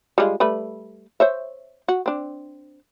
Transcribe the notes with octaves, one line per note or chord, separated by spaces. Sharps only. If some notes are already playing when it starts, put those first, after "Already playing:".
G3 G#3 F4
G3 A3 B4
C5 C#5 E5
F#4
C4 D4